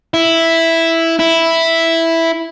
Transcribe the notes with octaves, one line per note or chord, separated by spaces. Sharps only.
E4
E4